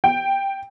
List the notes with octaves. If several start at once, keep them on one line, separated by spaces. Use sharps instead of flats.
G5